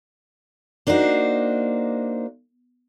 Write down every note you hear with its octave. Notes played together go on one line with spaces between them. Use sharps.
A#3 D4 D#4 F#4 C5